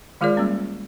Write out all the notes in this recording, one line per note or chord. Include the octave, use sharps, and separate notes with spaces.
D#3 G#3 F4 G#4 A#4 D5
G3 A#3 C#4